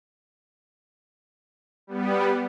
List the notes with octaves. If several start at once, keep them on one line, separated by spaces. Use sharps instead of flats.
G3 B3